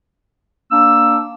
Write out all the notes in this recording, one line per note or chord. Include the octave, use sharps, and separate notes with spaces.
A#3 D4 E6